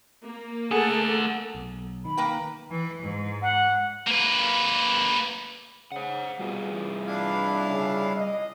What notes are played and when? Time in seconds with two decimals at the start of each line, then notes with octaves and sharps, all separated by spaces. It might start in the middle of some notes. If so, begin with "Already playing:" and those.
0.25 A#3
0.71 A3 G#4 A4 F#5
1.55 B1
2.05 D#3 B5
2.17 A#3 B4 G5
2.70 E3
3.02 G#2
3.42 F#5
4.07 A#3 B4
5.92 C#3 C5 F#5
6.39 B2 G3 F4 G#4
6.71 E3
7.07 D4 E4 F5
7.69 C#3
8.17 D#5